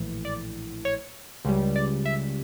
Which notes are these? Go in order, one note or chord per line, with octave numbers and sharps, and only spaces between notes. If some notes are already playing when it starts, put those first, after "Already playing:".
Already playing: A#1 A2 E3
D5
C#5
C#2 C#3 G3
D5
E5